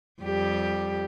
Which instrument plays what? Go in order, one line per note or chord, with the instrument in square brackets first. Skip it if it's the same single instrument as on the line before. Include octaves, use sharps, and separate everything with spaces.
[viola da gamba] F2 G3 G4